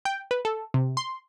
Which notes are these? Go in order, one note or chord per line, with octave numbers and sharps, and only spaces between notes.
G5
B4
A4
C3
C6